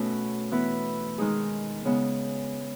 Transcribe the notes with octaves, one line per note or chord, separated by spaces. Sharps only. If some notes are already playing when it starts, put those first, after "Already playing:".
Already playing: B2 A3 C#4 F#4 A4 B4
E3 B3 E4 B4
D#3 G#3 D#4 G#4
C#3 G#3 B3